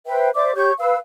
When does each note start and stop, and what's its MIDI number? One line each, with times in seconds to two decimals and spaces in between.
0.07 0.30 71
0.07 0.30 72
0.07 0.30 76
0.07 0.30 79
0.35 0.54 72
0.35 0.54 74
0.35 0.54 76
0.35 0.54 86
0.55 0.72 67
0.55 0.72 73
0.55 0.72 85
0.55 0.72 91
0.80 0.96 71
0.80 0.96 77
0.80 0.96 88